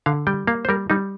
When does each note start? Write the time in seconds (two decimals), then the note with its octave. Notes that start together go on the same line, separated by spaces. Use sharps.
0.06 D3 F5
0.27 G3 G5
0.47 A#3 F5
0.65 C5
0.69 G3 A#4
0.90 G3 D#4